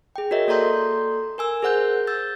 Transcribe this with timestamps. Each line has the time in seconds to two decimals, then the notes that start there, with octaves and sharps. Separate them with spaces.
0.16 G#4 G5
0.31 F#4 A#4 C#5 D#5 E5
0.48 A#3 A4 D5 A#5 C6 G6
1.38 A#4 G#5 E6
1.62 G#4 A#4 C5 F#5 F#6 G6
2.07 E6 G6 A6